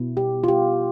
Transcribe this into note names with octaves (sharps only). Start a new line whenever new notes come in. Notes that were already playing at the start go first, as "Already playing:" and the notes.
Already playing: B2 B3 E4
G4
F4
G4